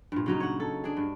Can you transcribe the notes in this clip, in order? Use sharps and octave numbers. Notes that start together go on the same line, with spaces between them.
G2 A#2
C#3 F#3 D#4
C#5 F#5
A4
D4 G#4
G2